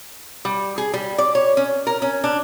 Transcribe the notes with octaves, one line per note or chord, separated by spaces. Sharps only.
G3
G#4
G3
D5
C#5
C#4
A#4
C#4
D4